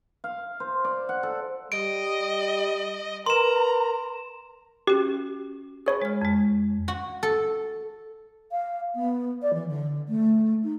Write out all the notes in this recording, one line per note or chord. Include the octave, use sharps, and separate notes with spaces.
F5
C5
D5
F#5
A4
G3 D#5 D7
A#4 B4 A#5 C6 E7
C#4 F#4 G4
G#4 C#5 B5 C#6
G#3 F6
F2 G#3
F#4
A4
F5
B3
D5
E3
D3
A3
D#4